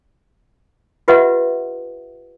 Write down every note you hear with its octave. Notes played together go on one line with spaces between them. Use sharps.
F4 G4 B4 D#5 E5 F#5